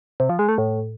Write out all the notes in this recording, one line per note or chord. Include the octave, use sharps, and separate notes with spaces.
C3
F3
G#3
A3
A2